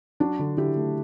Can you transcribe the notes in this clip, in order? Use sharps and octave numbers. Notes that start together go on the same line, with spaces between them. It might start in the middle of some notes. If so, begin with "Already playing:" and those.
F#3 D4 F#4
D3
D3 E4 G4
A3